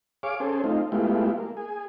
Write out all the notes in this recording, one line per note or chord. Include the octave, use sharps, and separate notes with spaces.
G#4 C#5 F5 D6
C#4 G#4 A4 C5
A3 C4 D#4 F4
G#3 A3 B3 E4 F4 G4
A#3
G#4